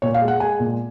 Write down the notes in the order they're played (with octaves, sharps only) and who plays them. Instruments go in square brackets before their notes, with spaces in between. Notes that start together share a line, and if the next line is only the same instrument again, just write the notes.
[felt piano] A#2 C#5
F5
G#3
F#5
G#3 G#5
A#2